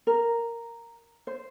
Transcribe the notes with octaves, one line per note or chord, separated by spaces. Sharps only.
A#4
C5